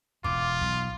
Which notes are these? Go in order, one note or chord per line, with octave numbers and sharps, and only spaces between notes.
E1 E2 F4 D6
B1